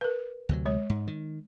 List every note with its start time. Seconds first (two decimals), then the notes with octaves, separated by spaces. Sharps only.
0.01 A#4 B4
0.49 D2 C3 F#3
0.66 G#3 C#5
0.90 G#2
1.07 D#3